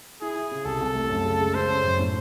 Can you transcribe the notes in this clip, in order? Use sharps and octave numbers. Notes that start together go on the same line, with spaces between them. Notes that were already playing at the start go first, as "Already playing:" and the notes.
E4 G#4
E4
C#3
C2 A4
C2
A3
F#2
C#3
G#3
C#3 C5
C#4
F#2
A2